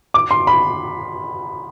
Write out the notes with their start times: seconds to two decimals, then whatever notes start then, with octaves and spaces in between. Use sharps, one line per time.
0.14 D6
0.31 C6
0.47 B5